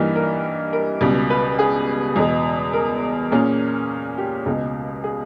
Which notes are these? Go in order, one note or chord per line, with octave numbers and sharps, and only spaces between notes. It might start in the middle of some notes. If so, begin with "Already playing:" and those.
Already playing: G2 E3 G3 A#3 D#4
A#4
A#4
C#2 B2 G3
B4
G#4
E2 B2 G#3
A#4
A#2 A#3 C#4 G#4
G4
C#2 B2 G#3
G#4